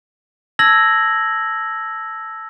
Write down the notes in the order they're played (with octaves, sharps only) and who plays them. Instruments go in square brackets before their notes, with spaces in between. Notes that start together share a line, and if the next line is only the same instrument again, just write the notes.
[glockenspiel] A5 E6 G#6 A#6 F#7